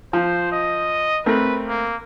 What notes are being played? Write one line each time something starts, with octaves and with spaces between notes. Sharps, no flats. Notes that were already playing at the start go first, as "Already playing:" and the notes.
F3 C5
D#5
A3 C4 A#4 B4
A#3